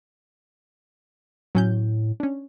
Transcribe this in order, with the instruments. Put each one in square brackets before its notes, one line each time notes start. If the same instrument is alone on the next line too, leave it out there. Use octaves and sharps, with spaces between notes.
[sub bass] A2 [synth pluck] F#3 C#4 G6
[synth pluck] C#4 D4